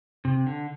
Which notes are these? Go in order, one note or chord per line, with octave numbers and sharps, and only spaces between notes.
C3
D3